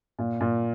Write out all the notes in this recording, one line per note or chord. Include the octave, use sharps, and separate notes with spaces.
A#2
A#2